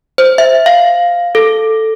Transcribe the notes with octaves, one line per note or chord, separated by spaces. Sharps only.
C5
E5
F5
A4